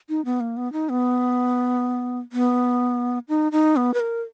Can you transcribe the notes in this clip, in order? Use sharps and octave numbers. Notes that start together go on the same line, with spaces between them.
D#4
B3
A#3
B3
D#4
B3
B3
D#4
D#4
B3
B4
A#4